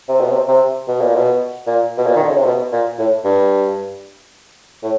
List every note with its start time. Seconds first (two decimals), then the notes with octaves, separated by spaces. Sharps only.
0.09 C3
0.21 B2
0.32 C3
0.48 C3
0.88 B2
1.01 A#2
1.15 B2
1.67 A#2
1.98 B2
2.06 A#2
2.16 D#3
2.23 D3
2.31 C#3
2.38 C3
2.45 B2
2.72 A#2
2.99 A2
3.24 G2
4.83 A2